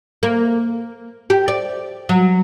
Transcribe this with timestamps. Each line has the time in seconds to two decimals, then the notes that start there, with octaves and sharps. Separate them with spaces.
0.23 A#3
1.30 G4
1.48 D5
2.09 F#3